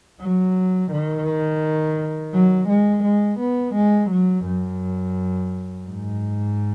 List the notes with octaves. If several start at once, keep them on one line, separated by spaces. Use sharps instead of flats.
F#3
D#3
F#3
G#3
G#3
B3
G#3
F#3
F#2
G#2